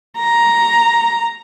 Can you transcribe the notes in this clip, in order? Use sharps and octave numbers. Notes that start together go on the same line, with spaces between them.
A#5